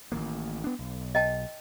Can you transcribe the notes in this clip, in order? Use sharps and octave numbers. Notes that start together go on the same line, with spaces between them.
A1 D#3 A#3
B3 D4
B1
D#5 G5 A5